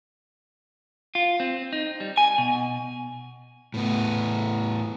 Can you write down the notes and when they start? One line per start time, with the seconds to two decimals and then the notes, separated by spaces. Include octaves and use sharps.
1.15 F4
1.40 C4
1.73 D#4
2.00 G3
2.17 G#5
2.38 B2
3.74 A2 B3